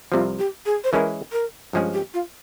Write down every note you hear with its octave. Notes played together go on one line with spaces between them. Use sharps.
C2 C3 F3 F4
G4
G#4
C5
E3 G#3 C#4 E4 G#4 A#4
A#4
G2 F3 G#3 C#4 G#4
G4
F4